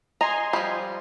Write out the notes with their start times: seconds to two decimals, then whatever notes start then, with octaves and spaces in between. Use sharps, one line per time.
0.21 D#5 G#5 A#5 C6
0.53 F3 G3